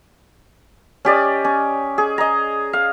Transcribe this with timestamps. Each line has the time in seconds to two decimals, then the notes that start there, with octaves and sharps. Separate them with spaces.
1.05 C#4 G4 D5 D#5
1.45 C#4
1.98 G#4
2.18 D#5 A#5
2.73 F5